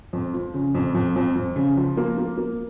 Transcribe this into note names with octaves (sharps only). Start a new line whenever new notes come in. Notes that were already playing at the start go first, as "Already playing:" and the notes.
F2
F3
C#3
F2
F2
F2
F2
C#3
F3
A#3
A#3
A#3